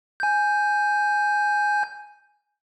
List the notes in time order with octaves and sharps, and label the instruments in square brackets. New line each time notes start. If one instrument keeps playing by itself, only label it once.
[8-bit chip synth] G#5 G6